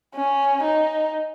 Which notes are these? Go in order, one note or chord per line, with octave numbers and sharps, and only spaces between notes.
C#4
D#4